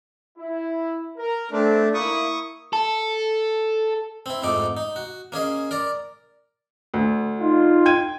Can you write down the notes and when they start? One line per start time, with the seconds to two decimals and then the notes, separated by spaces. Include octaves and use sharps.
0.38 E4
1.18 A#4
1.51 A3 C4 D4
1.94 A#3 E4 C#6 D#6
2.73 A4
4.26 C4 E4
4.42 F2 G#2 A3 D#4 D6
4.77 D#4
4.96 F#4
5.32 A#3 C#4 G#4 D#5
5.71 A#4 D5 A#5
6.94 D2
7.39 D#4 F4
7.85 G5 G#6 D#7